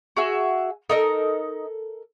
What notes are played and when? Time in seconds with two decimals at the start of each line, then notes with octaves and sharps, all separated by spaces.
0.16 F#4 G#4 E5
0.89 D#4 A4 A#4 D#5